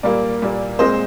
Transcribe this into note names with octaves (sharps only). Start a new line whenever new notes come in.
A#2 G3 A#3 A#4 D5
A#2 G3 A#3
A#2 G#3 C4 C5 D#5